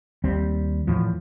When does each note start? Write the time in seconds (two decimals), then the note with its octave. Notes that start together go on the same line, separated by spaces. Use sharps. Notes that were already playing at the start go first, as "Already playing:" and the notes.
0.24 D#2 G3 C4
0.87 E2 A2 F3